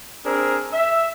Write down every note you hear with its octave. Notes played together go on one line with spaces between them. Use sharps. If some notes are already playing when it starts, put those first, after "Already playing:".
C4 D4 G#4 A#4
E5